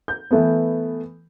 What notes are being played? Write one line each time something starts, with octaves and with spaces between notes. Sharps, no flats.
G6
E3 A3 B3